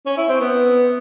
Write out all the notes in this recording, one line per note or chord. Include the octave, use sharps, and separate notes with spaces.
C#4
E4
C4
B3